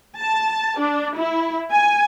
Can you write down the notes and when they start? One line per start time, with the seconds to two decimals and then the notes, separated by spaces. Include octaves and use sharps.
0.17 A5
0.79 D4
1.17 E4
1.71 G#5